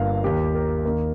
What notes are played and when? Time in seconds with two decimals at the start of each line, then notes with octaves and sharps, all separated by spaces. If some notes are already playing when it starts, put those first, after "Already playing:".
Already playing: G1 G2 A#3 F5
0.23 D#2 D#3 A#3 G4
0.55 A#4
0.85 D#2 D#3 A#3